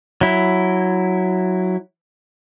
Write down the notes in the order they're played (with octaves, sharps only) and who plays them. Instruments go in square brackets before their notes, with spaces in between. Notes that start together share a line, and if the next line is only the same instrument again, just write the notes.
[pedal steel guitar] F#3 E4